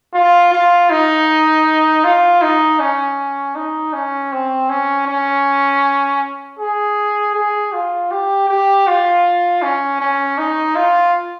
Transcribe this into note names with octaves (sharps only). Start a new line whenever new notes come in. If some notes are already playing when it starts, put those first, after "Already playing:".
F4
F4
D#4
F4
D#4
C#4
D#4
C#4
C4
C#4
C#4
G#4
G#4
F4
G4
G4
F4
C#4
C#4
D#4
F4